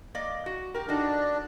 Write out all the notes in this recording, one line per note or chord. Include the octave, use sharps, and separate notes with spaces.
A#3 D5 D#5
F#4
G4 A#4
D4 D#4 F#4 A4